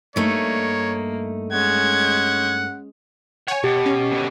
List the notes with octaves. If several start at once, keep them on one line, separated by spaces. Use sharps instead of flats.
G2 A3 A#3 D#4 C#5
G#3 C#4 F#5 G#6
C#5 F#5 G#5
B2 G4
C#4
B2 D3